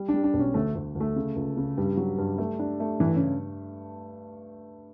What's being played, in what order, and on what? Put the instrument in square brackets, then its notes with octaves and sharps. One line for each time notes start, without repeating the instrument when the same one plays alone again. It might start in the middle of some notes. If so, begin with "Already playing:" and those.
Already playing: [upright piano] G3
[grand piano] D4
[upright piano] G3
[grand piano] D4
[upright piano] B1
[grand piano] C#4
[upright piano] D2 [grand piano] A3
[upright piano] D2
D2
[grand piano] A3
[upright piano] C#3
C#2
C#3
[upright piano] G2 [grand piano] G3
[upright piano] F#3
G2
A3
D4
A3
[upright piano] G2 [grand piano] E3
[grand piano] C#3